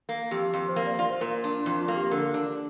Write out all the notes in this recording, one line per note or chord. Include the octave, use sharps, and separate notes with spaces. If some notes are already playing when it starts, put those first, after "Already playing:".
A#3
F2 G4
F2
C5
A#3 A#4
D5
F4 F5
C5
A#2 A#4
D4
F2 F4
F4
A#3
G4
D3 A#4
D4